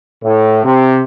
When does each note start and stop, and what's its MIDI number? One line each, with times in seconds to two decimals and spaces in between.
0.23 0.60 45
0.65 1.00 48